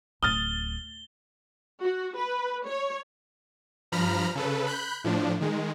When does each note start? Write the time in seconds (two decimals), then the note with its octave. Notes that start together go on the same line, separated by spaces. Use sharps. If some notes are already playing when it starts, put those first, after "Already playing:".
0.23 D1 D#6 F6 A6 G7
1.83 F#4
2.17 B4
2.68 C#5
3.92 G2 F3 A#5 B5 F6
4.35 C#3 A4 B4
4.67 B5 F#6 G6
5.04 A2 F3 D4
5.41 D#3 G#3